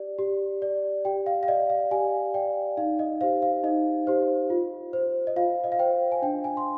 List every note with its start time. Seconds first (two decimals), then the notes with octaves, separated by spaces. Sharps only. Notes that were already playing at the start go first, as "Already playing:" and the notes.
Already playing: G4 D5
0.19 G4
0.62 D5
1.05 G4 G5
1.26 F5
1.43 F5
1.48 D5 D#5
1.70 F5
1.91 G4 G#5
2.34 D5 G5
2.77 D#4 F5
2.99 D#5
3.21 G4 C5 F5
3.42 F5
3.64 D#4 D#5
4.07 G4 C5
4.50 F4
4.93 C5
5.27 D#5
5.36 F4 F5
5.64 D#5
5.72 F5
5.79 C5 G5
6.12 G#5
6.22 D4 G5
6.44 G#5
6.57 C6